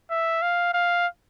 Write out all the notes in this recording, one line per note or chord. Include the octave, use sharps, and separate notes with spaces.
E5
F5
F5